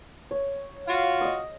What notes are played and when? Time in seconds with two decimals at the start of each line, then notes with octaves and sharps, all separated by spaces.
0.31 C#5
0.88 F4 F#4 F5
1.21 D#5 D#6